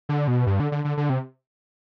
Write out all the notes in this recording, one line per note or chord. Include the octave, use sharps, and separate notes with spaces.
D3
B2
G2
D3
D3
D3
D3
C3